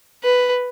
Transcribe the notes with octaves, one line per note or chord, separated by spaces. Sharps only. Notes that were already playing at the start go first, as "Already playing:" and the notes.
B4